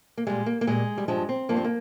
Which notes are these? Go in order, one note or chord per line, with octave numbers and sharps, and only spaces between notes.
A#3
A#2 G3 G#3
A#3
A#3
A#2 G3 G#3
G3
G2 F3 G#3
C4
G2 F3 A#3
C4
A#3